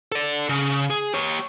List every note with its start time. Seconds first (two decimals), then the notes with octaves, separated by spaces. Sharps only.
0.12 A4 D5
0.49 C#3
0.90 G#4
1.14 G4 C#5